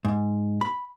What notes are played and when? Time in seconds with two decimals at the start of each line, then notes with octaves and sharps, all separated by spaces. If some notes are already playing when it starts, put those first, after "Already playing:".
0.05 G#2
0.61 B5